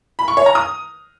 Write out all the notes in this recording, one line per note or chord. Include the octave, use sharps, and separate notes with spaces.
B5
C#6
C#5
A#5
D#6